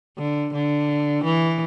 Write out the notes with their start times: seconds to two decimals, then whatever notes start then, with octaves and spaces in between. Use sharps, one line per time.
0.18 D3
0.54 D3
1.25 E3